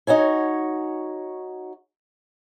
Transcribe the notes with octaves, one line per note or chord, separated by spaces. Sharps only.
D#4 F#4 C#5 G#5